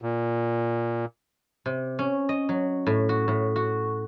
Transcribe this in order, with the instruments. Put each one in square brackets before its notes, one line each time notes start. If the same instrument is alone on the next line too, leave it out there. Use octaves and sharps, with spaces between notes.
[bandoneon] A#2
[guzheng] C3
C#4
D#5
F#3
A2
F#4
A2
F#4